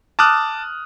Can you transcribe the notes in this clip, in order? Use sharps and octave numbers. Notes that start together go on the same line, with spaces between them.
A5 D6 D#6 F6 F#6